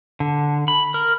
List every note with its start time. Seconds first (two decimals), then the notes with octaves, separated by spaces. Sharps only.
0.20 D3
0.68 B5
0.94 A#4